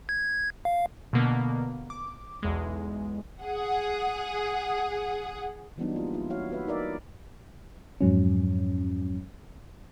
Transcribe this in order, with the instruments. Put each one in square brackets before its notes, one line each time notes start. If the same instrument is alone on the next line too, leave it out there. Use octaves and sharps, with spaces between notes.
[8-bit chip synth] G#6
F5
[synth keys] B2 D3 A#3 B3
D6
B1 E2 G#3
[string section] G#4 F#5
[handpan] E3 F#3 G3 B3 D4 D#4
A#3 F4
E4 F4
E4 F#4 C#5 F5
F#4 B4 E5
D#4 A#4 D5 E5
[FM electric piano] F2 G#2 F#3 C#4